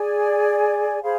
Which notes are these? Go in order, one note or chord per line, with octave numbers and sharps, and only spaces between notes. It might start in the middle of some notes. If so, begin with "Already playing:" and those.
Already playing: G#4 D5 G#5
G#4 C5 F5 B5